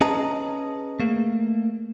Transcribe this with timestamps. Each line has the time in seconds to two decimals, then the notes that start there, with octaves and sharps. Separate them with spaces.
0.01 C#4 G#4 B4 D#5 A5 A#5
1.00 A3 A#3